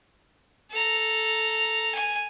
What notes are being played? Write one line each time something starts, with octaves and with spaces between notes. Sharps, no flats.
A4 A#5
G#5